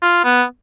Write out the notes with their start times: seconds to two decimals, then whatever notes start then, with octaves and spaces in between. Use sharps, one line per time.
0.02 F4
0.24 B3